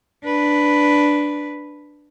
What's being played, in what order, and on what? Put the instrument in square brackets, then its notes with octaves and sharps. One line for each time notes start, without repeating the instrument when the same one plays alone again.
[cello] D4 B4